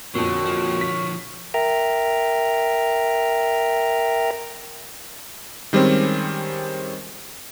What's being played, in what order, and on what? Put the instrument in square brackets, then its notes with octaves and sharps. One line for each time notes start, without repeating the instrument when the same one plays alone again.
[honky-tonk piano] F2 A#2 [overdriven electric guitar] D3 [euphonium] F#4 [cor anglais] C#5
[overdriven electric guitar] D3 F3
[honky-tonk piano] B6
[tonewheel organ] A#4 E5 G5 A#5
[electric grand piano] D#3 G3 G#3 C4 C#4